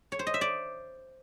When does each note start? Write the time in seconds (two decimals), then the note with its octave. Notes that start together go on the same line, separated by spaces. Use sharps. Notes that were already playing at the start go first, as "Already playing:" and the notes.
0.12 C#5
0.19 C5
0.27 D#5
0.34 E5
0.41 D5